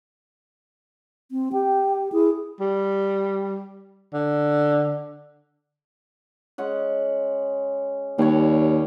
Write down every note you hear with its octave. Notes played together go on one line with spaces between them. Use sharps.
C4
G4 G5
E4 G#4
G3
D3
G#3 C#4 F#5
D#2 G3 C#5